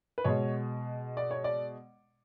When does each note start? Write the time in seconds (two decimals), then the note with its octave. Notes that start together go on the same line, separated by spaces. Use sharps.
0.18 B4
0.24 B2 G#3 C#5
1.17 D5
1.31 C#5
1.44 D5